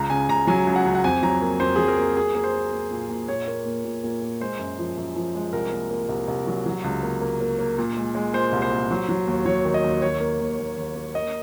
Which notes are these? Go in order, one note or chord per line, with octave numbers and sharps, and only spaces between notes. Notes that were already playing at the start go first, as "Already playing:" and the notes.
Already playing: C#2 A#5
C#3 G#5
C#2 A#5
F#3 G#5
C#2
F#5
C#2
F#5
F2 G#5
F#3 A#5
A#3
F2 C5
F#3 G#4
A#4
A#3
A#3 G#4
A#3
C5
A#3
A#3
A#2
A#2
A#2 C#5
A#3
A#2
A#2
A#2
A#2
G#3 C5
F#2
F3
F#2
F3
G#3
C2 A#4
A#3
A#3
C2
C2
F#3
F#3
C#2
A#3
A#3
A#3
A#3
A#2
G#3
G#3
A#2 C5
C2
C5
A#2
F#3
F#3
D#2
F#3 C#5
D#3
D#5
D#2
D#3 C#5
A#3
D#2
D#2
D#2
A#3
A#3 D#5